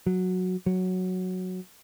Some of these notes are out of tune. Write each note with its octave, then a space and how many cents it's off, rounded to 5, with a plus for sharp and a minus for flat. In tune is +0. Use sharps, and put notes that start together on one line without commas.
F#3 -10
F#3 -5